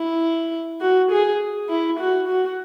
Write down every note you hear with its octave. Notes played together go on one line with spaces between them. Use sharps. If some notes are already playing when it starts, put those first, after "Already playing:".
Already playing: E4
F#4
G#4
E4
F#4
F#4